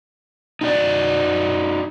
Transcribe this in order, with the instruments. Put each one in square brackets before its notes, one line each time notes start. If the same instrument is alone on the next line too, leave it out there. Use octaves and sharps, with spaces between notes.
[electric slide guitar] D#4 F#4 D5